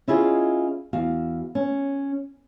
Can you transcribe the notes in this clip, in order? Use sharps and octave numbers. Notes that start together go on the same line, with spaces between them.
C#4 E4 F4 G#4 D#5
E2 F#4 F5
C#4